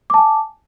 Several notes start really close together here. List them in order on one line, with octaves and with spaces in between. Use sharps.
D6 A5 G#5